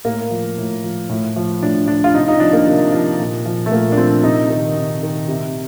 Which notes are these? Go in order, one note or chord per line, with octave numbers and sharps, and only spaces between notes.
A2 A#3
F3
A2
F3
A2
F3
A2 D4
F3 D4
F4
C3 D#4
D#4
F3 D4
A#3
C3
F3
A#2
F3
A3
A#2 A#3
D4
F3 C4
C3 D#4
D#3
C3
D#3
C3